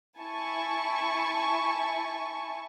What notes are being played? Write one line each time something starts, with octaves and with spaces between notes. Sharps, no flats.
E4 G#5 A5 C#6